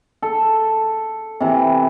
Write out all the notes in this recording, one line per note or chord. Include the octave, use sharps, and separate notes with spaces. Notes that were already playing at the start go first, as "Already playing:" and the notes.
A4
C3 E3